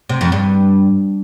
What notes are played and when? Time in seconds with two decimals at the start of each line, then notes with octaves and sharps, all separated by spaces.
0.09 C3
0.21 F2
0.32 G2